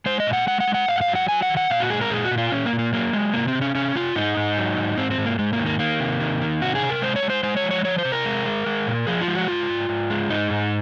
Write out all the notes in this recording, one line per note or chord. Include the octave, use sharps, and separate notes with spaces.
G#3 C5
D#5
A#2
F#5
G#3 F#5
F#5
G#3
F#5
G#2 F5
F#5
F5
F#3
F#5
F#3 G#5
F#5
D#3
F#5
A#2 F5
F#4
G#3 G#4
A#4
A#2 G#4
F#4
A#2
F4
A#2 C#4
A#3
A#2
A#3
F#3 A#3
F#3 G#3
C3 A#3
C4
C3
C#4
C3 C#4
C3 F4
G#2 D#4
G#2
F#3
G#2
G#2 C4
C4
G#2
A#3
G#2 G#3
A#3
D#3
A#3
D#3 A#3
C3
D#3
D#3
C3 F#4
G#4
C3
A#4
G#3 C5
C#5
G#3
C5
G#3 C5
C#5
F3
C#5
F3 C#5
C5
C3
A#4
G#3
G#3
G#3
A#2
F3 G#4
F4
G#3
F#4
G#2 F4
G#2
G#2
G#3
G#2 D#4
G#2